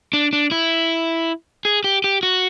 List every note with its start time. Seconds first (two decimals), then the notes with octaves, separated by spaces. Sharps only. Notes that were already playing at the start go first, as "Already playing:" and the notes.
0.13 D4
0.33 D4
0.51 E4
1.65 G#4
1.84 G4
2.04 G4
2.23 F#4